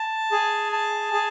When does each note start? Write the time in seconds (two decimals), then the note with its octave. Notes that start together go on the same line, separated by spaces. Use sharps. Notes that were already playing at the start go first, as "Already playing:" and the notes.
Already playing: A5
0.32 G#4
0.73 A5
1.13 G#4